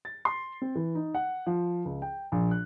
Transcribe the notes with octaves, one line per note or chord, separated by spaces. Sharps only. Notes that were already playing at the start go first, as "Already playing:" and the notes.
A6
C6
C4
E3
D#4
F#5
F3
C#2
G5
A#1
F#6